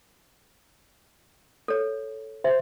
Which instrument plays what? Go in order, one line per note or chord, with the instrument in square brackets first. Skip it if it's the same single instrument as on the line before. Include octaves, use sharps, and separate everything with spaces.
[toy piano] A4 C#5
[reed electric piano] C5 [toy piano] E5